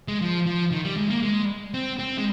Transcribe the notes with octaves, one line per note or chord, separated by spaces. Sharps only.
G#3
F3
F3
D#3
G3
G#3
A#3
G#3
C4
C4
G#3